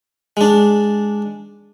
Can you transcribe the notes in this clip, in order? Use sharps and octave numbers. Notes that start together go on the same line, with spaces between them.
G#3 D4